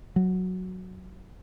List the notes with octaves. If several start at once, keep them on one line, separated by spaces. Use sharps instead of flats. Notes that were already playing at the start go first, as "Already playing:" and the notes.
F#3